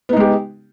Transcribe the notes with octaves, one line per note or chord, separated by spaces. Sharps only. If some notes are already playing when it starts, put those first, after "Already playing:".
G#3 B3 D#4 G4